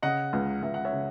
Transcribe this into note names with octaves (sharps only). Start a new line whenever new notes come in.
C#3 D#5 F#5
C#2
C#2 E5
F#5
C#5 E5
C#3